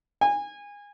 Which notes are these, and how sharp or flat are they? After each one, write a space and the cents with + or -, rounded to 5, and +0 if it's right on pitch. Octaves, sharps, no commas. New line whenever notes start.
G#5 -25